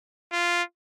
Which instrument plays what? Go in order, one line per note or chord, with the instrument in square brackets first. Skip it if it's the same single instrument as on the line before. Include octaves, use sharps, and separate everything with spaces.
[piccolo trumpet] F4